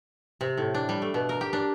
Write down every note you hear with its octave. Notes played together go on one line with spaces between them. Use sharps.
C3
A2
D4
G3
A3
B2
A#4
G4
D4